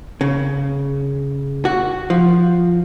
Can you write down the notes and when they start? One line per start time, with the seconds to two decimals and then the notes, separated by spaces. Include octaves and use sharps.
0.21 C#3
1.65 F#4
2.10 F3